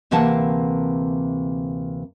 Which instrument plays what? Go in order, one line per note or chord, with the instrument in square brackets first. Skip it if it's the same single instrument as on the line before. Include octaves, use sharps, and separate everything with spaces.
[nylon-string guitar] D2 C3 E3 A#3 F#5 A5